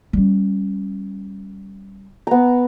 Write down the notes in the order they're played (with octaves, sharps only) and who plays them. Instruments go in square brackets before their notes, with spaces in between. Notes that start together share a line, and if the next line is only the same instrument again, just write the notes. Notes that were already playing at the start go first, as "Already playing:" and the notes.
[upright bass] G3 C#4
[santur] B3 A#5